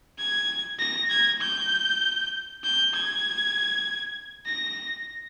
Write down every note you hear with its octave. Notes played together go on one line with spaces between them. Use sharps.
G#6
A#6
G#6
G6
G6
G#6
A#6